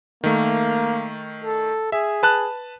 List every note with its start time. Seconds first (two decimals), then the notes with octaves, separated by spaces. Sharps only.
0.24 D#3 A3 A#3
1.44 A4
1.92 G#4 E5
2.23 B4 A5 F#6